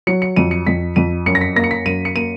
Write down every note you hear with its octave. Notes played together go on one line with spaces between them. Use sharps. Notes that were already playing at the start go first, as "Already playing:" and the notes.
F#3 C#7
C#7
F2 D#7
C#7
F2 B6
F2 D#7
F#2 C#7
A#6
B6
A#3 A#6
C#7
B6
F#2 D#7
C#7
A#3 D#7